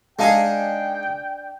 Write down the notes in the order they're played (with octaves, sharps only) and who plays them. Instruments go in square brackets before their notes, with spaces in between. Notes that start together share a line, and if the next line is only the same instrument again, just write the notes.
[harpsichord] G#3 D#4 G#4 [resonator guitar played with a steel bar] D4 F5 G#5 [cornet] G5